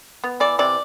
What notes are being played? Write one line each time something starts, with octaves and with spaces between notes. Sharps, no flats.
B3
E3 D5
C3 D5